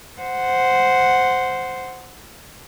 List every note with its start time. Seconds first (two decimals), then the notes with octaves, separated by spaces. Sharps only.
0.21 C5 F#5